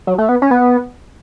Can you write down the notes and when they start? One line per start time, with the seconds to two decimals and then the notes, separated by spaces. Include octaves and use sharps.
0.07 F#3
0.18 A3
0.29 B3
0.42 C#4
0.51 B3